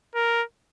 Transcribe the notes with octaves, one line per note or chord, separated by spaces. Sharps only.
A#4